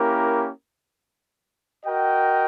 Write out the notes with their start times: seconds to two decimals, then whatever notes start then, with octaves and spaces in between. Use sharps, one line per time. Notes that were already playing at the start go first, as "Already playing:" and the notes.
Already playing: A#3 C#4 E4 G4 A#4
1.85 F#4 A#4 D#5 G5